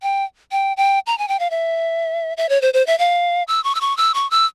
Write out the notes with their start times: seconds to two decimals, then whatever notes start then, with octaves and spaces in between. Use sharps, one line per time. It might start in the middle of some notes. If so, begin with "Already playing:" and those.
0.02 G5
0.52 G5
0.77 G5
1.07 A#5
1.18 G#5
1.28 G5
1.40 F5
1.50 E5
2.37 E5
2.49 C#5
2.62 C5
2.74 C5
2.87 E5
2.99 F5
3.48 E6
3.64 C#6
3.75 E6
3.81 C#6
3.97 E6
4.14 C#6
4.31 E6